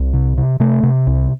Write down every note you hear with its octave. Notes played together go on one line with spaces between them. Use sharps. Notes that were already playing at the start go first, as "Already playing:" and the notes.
Already playing: C2
C3
C3
C3 A3
C3
C2